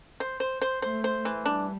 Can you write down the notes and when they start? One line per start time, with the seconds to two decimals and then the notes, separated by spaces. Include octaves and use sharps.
0.20 C5
0.40 C5
0.62 C5
0.82 A3 C5
1.04 C5
1.25 E3
1.46 G3 D4